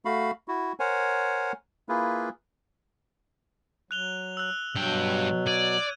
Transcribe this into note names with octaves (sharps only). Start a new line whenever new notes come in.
A3 F#4 F5 B5
E4 F#4
A#4 C5 C#5 F#5 G#5
A#3 E4 F4 G#4 B4
F#3 F#6 F7 G7
E6 F#6
G2 B2 F#3 G5
D5 G#6 D#7